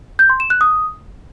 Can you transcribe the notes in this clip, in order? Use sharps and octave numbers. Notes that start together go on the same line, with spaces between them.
G6
C6
E7
F#6
D#6